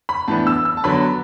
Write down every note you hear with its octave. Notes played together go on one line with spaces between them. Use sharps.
B5
A2 E3 B3 D4 A5
E6
E6
A5
D3 F#3 B3 D4 B5